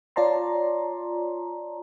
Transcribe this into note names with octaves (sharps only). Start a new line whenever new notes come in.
F4 C#5 D5 A5 A#5 C6